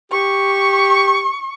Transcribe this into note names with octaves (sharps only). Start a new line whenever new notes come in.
G4 C#6